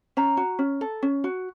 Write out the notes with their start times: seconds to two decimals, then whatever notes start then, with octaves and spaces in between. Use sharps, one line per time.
0.17 C#4 A#5
0.37 F#4
0.59 C#4
0.81 A4
1.03 C#4
1.24 F#4